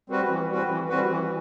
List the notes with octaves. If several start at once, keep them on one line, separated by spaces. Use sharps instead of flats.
G3 C4 F#4 B4
E3
G3 C4 F#4 B4
E3
G3 C4 F#4 B4
E3